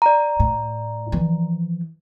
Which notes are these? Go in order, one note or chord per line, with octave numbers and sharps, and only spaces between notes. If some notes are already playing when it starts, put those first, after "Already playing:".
D5 A#5
A2
E3 F3